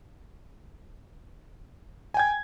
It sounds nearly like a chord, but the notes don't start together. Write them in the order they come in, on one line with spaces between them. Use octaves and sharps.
G#5 G5 G#6